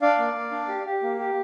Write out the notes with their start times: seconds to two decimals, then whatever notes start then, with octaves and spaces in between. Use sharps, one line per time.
0.02 D4 D5 F5
0.19 A#3
0.35 A#3
0.52 D4
0.68 G4
0.85 G4
1.03 A#3
1.19 G4